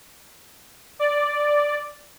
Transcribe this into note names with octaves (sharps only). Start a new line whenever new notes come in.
D5